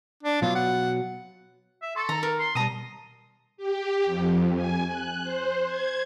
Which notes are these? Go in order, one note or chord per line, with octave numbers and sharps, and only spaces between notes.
D4
B2 F#3 F4
F#5
E5
A4 C6 C#6 A6
D#3 A#5
A#4
C6
B2 G3 A5 A#5 D#6
G4
F2
G#5
F#6
C5
G#6